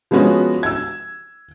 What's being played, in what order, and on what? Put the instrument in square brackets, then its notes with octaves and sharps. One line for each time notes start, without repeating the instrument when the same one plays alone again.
[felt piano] F3 G#3 B3 C#4 F#4
E6 G#6